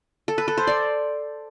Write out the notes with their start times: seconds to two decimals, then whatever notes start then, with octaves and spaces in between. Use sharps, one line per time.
0.28 A4
0.38 B4
0.48 A4
0.58 C5
0.67 D5